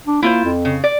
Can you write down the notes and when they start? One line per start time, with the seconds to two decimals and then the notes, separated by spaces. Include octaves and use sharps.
0.07 D4
0.22 A#3 E4 F4 C5
0.44 F2
0.65 C#3
0.84 D5